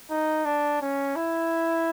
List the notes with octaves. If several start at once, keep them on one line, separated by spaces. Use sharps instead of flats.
D#4
D4
C#4
E4